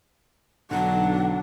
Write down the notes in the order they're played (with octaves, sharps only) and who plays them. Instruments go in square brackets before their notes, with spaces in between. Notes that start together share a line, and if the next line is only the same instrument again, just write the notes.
[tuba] B1 [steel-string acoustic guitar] D3 D#4 [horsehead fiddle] F#3 D4 [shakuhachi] F#5